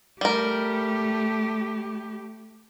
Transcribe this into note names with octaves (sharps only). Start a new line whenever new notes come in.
G3 A3 G4 A#4